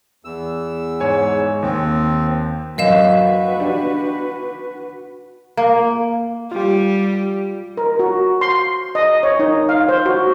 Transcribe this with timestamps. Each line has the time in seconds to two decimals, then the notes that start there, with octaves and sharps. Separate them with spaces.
0.25 E2 E6
1.00 G#2 C#5 G#5
1.63 D#2 C4
2.78 F#2 F#3 F#4 B4 D#5 F5 E7
3.60 D4 G4
5.57 A#3
6.52 G3 F4 G4
7.77 A#4
7.99 F#4
8.41 C6
8.95 D#5
9.23 C#5
9.39 D#4
9.69 F5
9.89 C5
10.06 F#4